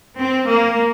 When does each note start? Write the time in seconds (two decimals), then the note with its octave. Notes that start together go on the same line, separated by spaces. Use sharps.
0.17 C4
0.48 A#3